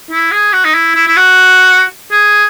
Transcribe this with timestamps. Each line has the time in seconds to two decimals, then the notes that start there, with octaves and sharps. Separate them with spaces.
0.11 E4
0.31 G#4
0.53 F#4
0.64 D#4
0.74 E4
0.95 E4
1.07 E4
1.16 F#4
2.12 G#4